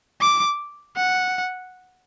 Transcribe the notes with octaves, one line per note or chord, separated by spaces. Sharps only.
D6
F#5